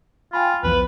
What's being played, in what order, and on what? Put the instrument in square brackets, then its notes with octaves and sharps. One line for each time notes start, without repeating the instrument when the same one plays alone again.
[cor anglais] F4 [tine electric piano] G5 G#5 B5
[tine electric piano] B1 E2 F3 [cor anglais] B4